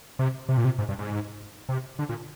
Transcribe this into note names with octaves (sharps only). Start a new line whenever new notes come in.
C3
C3
A#2
C3
G#2
G2
G#2
C3
D3
A#2